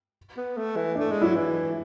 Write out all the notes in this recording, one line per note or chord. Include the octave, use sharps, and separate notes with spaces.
B3
A3
E3
D4
A3
G#3
F#3 E4
E3